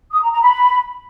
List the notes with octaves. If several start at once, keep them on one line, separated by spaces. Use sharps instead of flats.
D#6
A#5
A#5
B5